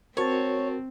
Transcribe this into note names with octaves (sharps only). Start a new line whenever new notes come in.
C4 F#4 A#4 C5 C#5 A5 A6